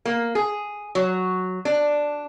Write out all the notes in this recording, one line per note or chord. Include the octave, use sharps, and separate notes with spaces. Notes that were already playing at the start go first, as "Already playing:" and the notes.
A#3
G#4
F#3
D4